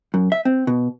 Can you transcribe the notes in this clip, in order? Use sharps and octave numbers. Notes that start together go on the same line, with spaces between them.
F#2
E5
C4
B2